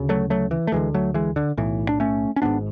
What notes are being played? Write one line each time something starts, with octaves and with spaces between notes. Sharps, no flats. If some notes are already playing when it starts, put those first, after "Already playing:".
Already playing: D2 C#3
F#3 A3
F#3 A3
E3
A3
D2 D3 E3 G#3
F#3 A3
E3 G#3
D3
B1 A2 E3
D4
A3 C#4
C#4
G#1 G#2 B3 D4